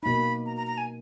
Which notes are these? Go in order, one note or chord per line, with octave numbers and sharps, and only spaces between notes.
B2 A#3 D#4 B5
A#5
A#5
A#5
G#5